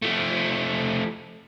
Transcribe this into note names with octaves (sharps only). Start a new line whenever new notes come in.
F3 A3